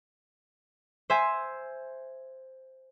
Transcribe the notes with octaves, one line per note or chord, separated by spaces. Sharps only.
C5 E5 G#5